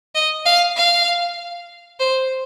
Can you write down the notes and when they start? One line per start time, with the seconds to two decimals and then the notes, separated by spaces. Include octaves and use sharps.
0.15 D#5
0.46 F5
0.77 F5
2.00 C5